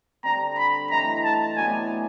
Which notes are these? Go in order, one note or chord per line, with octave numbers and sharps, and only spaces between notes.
D3 G3 C4 A#5
B5
E3 A3 C4 D#4 A#5
A5
A2 F#3 B3 D4 G#5